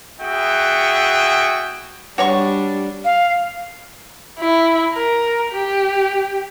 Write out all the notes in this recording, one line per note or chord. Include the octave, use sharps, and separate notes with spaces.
B3 F#4 G#4 E5 G5
G3 D4 F#4 C#5 C#6
F5
E4
A#4
G4